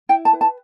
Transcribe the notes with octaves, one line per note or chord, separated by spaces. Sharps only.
E4 G5
A5
B4
A5